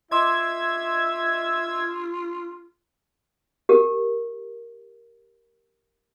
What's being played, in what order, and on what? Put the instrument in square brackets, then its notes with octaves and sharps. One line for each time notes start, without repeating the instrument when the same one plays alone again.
[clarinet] F4 [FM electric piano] D#5 C6 D6 [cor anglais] E5 [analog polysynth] E6 G#6
[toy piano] G4 A#4